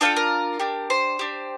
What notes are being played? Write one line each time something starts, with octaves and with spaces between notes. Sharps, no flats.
D4 F4 A4 G5
A#4
D4 G4
C5
D4 G4